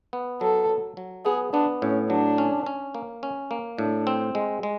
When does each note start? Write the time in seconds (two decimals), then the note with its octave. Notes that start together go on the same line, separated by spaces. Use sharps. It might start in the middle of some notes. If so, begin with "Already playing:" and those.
0.13 B3
0.41 F#3 A4
0.69 F#3
0.97 F#3
1.25 B3 G#4
1.53 B3 D4
1.82 A2 C#4
2.10 F#3 D4
2.38 C#4
2.66 C#4
2.95 A#3
3.23 C#4
3.51 A#3
3.78 A2 D4
4.07 C4
4.35 G#3
4.63 G#3